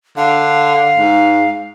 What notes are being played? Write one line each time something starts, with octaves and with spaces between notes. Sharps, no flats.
D3 F5
G#2